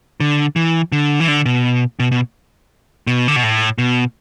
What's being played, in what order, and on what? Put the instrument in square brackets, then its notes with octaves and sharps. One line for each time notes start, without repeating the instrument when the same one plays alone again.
[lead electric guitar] D3
E3
D3
E3
D3
B2
B2
B2
B2
D3
B2
A2
B2